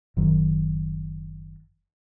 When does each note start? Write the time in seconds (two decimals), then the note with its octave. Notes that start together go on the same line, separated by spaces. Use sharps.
0.17 F#1 D#3 F#3